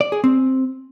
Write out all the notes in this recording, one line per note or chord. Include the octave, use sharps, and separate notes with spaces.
D5
G#4
C4